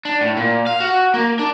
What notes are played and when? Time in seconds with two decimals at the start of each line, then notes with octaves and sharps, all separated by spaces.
0.05 D4
0.21 A2
0.37 A#2
0.67 F5
0.80 F#4
1.14 A#3
1.39 D4